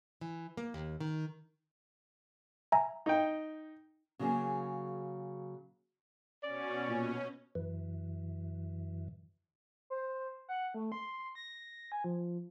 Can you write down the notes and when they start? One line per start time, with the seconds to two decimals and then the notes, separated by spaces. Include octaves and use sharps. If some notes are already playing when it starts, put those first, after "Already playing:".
0.21 E3
0.57 A#3
0.74 D#2
1.00 D#3
2.72 E5 G#5 A#5
3.06 D#4 G5
4.19 C#3 F#3 A#3 G#4
6.43 B2 C#4 D5
6.89 A#2
7.55 F#2 E3
9.90 C5
10.49 F#5
10.74 A3
10.92 C6
11.35 A#6
11.92 G#5
12.04 F3